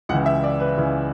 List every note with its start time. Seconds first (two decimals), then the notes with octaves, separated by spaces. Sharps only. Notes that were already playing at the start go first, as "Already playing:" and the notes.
0.09 C#2 C#3 E3 F#5
0.26 E5
0.43 D5
0.60 B4
0.77 C#2 C#3 E3